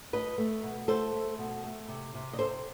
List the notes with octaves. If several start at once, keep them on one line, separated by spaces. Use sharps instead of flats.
A3 B4 D#5
A3
B2
A3 A4 C5
A3
B2
A3
C3
C3
D#5
C3 A4 C5